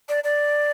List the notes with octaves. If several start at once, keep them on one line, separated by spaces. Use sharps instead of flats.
D5
D5